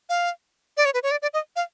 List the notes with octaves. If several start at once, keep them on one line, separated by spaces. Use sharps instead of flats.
F5
D5
C#5
B4
C#5
D5
D5
D#5
F5